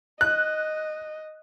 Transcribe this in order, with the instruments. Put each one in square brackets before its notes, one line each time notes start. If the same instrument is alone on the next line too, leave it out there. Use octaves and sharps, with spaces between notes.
[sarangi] D#5 [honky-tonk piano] F#6